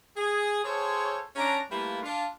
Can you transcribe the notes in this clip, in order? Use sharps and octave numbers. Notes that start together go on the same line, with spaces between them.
G#4
F4 G#4 A4 C5 C#5
C#4 D4 A#5
G3 A3 A#3 E4 F4 B4
D4 F4